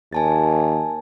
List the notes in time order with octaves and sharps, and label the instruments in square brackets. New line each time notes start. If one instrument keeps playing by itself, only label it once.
[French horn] D#2 [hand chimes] G#5 A5 A6